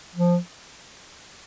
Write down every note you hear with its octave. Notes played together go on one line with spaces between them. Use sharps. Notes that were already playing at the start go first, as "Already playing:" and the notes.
F3